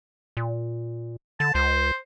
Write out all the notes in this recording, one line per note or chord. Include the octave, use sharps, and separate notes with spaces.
A#2
D3 A5
C#2 C5